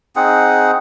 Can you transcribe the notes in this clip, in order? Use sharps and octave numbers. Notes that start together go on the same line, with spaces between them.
C4 D#4 G#4 F#5